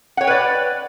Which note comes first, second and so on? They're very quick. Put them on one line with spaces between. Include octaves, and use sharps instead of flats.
F#5 C#5 G5 B4 D5